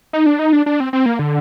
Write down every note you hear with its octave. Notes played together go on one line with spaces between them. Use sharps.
D#4
D4
D#4
D4
D4
C4
C4
A#3
D3